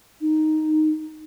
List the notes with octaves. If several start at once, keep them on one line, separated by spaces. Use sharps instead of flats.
D#4